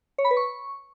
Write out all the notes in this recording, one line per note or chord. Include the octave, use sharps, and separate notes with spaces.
C#5
B5
B4
C#6